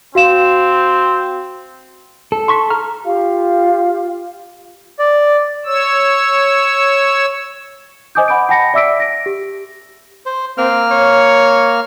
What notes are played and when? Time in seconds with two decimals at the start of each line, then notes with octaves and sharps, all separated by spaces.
0.15 C4 F#4 F5 E7
2.32 A4
2.48 C6 C#6 B6
2.70 A#5 F6
3.05 F4 G4 F5
4.99 D5
5.65 C#5 E6
8.15 C5 D#5 G#5 D6 D#6 G6
8.28 F#5 B5 D6 G6 D7
8.49 F#5 G5 A5 B5 A#6 C#7
8.74 D5 E5 D6 E6 B6 D7
9.00 A#6 D7
9.26 G4
10.26 C5
10.58 A#3 C4 F6
10.91 C#5